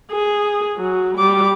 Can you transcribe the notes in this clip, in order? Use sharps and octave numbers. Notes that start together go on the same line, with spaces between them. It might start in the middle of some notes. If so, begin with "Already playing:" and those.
G#4
F#3
G3 D6